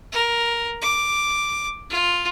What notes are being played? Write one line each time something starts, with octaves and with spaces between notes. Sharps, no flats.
A#4
D6
F4